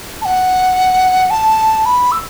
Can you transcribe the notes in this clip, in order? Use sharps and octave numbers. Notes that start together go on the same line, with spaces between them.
A5
F#5
A5
B5
E6